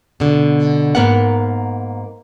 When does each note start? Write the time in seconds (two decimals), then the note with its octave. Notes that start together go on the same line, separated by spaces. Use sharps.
0.20 B2 D3
0.95 G#2 A#3 B3 A#4 F#5